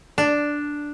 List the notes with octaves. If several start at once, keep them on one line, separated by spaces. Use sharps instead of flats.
D4